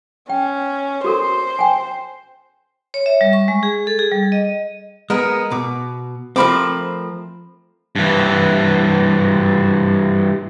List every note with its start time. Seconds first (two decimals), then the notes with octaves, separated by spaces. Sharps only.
0.30 C#4 G5
1.04 F#4 A4 A#4 C5
1.59 G5 G#5
2.94 C#5
3.06 E5
3.21 G3
3.33 C#6
3.48 G#3
3.63 G#4
3.87 A4
3.99 G#4
4.12 G3
4.32 D#5
5.10 G#3 B3 A#4
5.52 B2 D6
6.36 F3 A3 C4 A#4 B5 D6
7.96 G2 E3